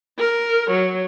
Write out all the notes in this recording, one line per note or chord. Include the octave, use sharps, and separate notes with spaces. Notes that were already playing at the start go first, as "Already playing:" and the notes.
A#4
F#3